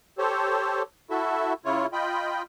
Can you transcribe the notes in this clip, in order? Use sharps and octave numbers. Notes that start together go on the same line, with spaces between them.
G4 A4 C5 C#5
E4 F#4 A4 E5
C#3 E4 F4 C#5
F4 D#5 G5 B5